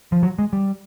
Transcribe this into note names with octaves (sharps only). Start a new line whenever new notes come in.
F3
F#3
G#3
G3